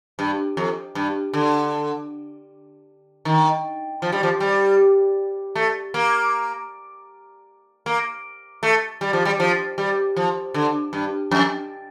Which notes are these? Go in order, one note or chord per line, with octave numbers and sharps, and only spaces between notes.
G2
F2
G2
D3
D#3
F3
G3
F3
G3
A3
A#3
A#3
A3
G3
F3
G3
F3
G3
F3
D3
G2
F2